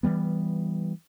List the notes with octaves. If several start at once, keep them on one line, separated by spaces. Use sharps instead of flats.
E3 F#3 G3 B3